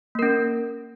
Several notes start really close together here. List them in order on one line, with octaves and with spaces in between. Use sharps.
A#3 A#4 C#4